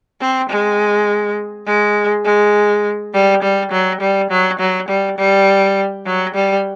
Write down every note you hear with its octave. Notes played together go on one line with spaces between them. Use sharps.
C4
G#3
G#3
G#3
G3
G3
F#3
G3
F#3
F#3
G3
G3
F#3
G3